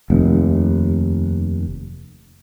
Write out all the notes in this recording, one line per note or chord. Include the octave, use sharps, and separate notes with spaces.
F1 D#2